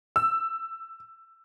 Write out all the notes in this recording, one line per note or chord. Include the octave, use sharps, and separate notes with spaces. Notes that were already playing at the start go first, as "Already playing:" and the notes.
E6